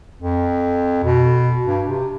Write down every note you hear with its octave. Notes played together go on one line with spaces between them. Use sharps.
F2
B2
G2
C3